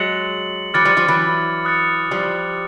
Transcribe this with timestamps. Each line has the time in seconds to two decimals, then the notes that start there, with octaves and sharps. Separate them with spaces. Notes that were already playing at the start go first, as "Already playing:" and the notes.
Already playing: F#3 G#3 A6 C#7 F#7
0.74 E3 F#3 D6 F6 A6 C#7 F#7
0.85 F3 G3
0.97 F3 G3
1.08 E3 F#3
1.65 D#6 F#6 A6 C#7
2.11 F3 G3